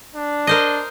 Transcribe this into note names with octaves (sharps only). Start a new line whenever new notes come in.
D4
A#4 C5 D#5